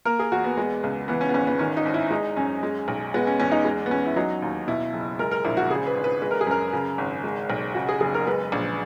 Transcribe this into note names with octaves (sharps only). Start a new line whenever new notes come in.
A#3 A#4
G#4
E2 F#4
B3
G#3
C#2
E3 B3
C#4
B3
G#1 C#4
B3
D#3 C#4
D#4
G#1
E4
G#3 D#4
F#2 C#4
G#3
B1
G#3 B3
C#4
E2 C#4
D#4
G#3
B3
E2 C#4
E4
F#3 D#4
D#2
B2 E4
F#1
G#3 A#4
A#4
A#1 E4
F#4
C#3 G#4
B4
G#1
B4
G#3 B4
A#4
G#4
F#2 A#4
C#3
G#1
G#3
B1
C#3 F#4
G#4
F#1 G#4
A#4
G#3 B4
A#1